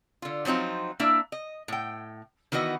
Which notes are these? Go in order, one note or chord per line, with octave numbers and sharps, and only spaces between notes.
D3 F4
F3 F#3 C4 D#4 F4
A#3 D4 E4 E5
D#5
A2 G5
D#3 E3 B3 F#4 D#5